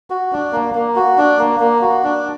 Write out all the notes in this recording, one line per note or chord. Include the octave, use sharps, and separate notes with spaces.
F#4
D4
A#3
A#3
F#4
D4
A#3
A#3
F#4
D4